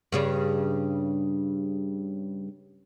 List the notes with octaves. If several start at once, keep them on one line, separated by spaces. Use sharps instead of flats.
G2 C#3 G3